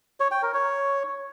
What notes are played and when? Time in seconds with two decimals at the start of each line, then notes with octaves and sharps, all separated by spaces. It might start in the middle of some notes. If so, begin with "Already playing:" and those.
0.20 C#5
0.31 G5
0.43 A#4
0.54 C#5